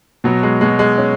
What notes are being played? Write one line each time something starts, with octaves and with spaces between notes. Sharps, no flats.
B2 F#3
G#3
B2 G#3
G#3
C#4